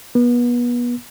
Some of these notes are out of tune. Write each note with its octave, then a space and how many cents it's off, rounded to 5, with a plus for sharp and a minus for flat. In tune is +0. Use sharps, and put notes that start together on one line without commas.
B3 -30